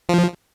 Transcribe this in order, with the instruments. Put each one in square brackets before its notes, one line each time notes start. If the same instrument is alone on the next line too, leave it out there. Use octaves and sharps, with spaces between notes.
[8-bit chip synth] F3